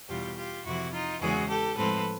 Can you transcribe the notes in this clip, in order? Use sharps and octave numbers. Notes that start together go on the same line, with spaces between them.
E2 B2 G3 F4 G4
F4 G4
F2 C3 E3 E4 F#4
D#4 F4
E2 C#3 E3 G#3 B3 F#4 G#4
G4 A4
A2 F3 G#3 C4 A4 B4